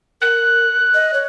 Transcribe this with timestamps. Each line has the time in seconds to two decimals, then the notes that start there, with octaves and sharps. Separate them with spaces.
0.22 A#4 F#6
0.94 D#5
1.14 C#5